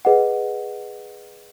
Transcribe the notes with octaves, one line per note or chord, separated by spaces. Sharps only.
G#4 B4 D#5 F#5